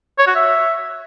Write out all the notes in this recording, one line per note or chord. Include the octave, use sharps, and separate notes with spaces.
C#5
F#4
E5